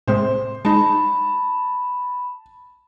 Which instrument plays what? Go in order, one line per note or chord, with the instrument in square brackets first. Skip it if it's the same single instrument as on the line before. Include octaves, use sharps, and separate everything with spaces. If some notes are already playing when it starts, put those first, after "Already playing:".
[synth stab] A2 C3 G#3 [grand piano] C5
[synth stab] G#3 D#4 [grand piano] A5 [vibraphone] B5